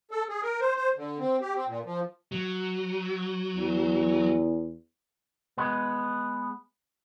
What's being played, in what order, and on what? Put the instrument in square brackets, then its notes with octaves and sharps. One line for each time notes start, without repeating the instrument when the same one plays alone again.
[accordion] A4
G#4
A#4
C5
C5
D3
C4
G4
C4
A#2
F3
[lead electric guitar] F#3
[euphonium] E2
[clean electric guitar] G#3 B3